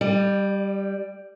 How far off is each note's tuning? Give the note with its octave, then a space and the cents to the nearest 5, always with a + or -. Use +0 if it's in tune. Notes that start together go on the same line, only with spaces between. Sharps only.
G3 +0 D5 +40